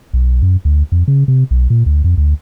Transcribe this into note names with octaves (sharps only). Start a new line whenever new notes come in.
B1
F#2
D2
F2
C#3
C3
B1
A#2
D2
F2
D2